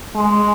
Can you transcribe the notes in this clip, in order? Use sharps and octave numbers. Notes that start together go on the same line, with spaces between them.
G#3